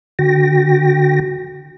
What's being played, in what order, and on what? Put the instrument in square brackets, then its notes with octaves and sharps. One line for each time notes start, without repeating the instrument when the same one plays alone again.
[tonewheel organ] D3 F#4 G5 A#6